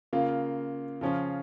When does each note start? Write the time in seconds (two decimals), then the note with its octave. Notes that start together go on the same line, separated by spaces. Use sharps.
0.13 C#3 A#3 F4
1.01 C#3 F3 C#4 F4